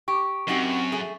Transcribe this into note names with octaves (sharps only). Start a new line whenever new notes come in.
G4 C#6
F#2 C4 D#4 F#4 G4
A3 G#4